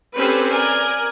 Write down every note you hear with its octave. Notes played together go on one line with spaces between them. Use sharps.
C4 C#4 G4 A4 B4 C5
A#4 D5 G#5